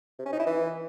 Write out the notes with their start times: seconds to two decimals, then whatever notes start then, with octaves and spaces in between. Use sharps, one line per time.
0.19 C3
0.26 C#4
0.32 D#4
0.39 E4
0.46 E3